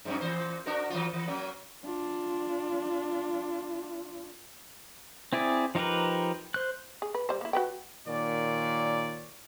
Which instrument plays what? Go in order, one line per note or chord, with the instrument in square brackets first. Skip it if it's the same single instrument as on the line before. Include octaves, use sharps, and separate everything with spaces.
[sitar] G2 F#3 C#4
A#2 E3 C5
D4 F#4 A#4
E3 F#3 F4
E3
F#3 A#3 C#4
[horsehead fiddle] D4 F4
[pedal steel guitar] C4 E4 G#4 D5
F3 D#4 G4 A#4 B4
C5 F#6
[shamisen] G#4
B4
G3 C5
A#3 E4
F#4 B4 G5
[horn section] A#2 D#3 C#5 D5